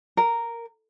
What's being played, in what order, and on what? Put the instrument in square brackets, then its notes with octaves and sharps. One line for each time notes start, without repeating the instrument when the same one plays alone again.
[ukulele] A#4